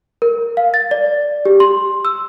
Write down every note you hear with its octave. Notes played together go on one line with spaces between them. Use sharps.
A#4
F5
A6
D5
G4
C6
E6